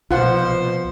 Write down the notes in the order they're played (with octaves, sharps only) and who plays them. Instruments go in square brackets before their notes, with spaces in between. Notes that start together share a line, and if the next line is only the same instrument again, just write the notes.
[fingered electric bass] C2 [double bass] B2 F3 [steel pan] F4 F#5 [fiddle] C5